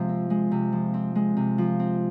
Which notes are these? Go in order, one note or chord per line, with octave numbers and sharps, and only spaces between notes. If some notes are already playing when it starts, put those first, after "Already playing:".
Already playing: C3 F3 G#3
C4
G#3
C3
F3
C4
G#3
C3
F3
C4